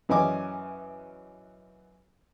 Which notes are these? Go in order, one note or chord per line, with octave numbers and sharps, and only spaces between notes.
F#2 E3 C#4 D#5 G#5 D6